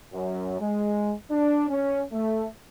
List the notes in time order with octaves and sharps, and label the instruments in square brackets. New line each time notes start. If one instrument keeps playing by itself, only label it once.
[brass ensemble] F#2
G#3
D4
C#4
A3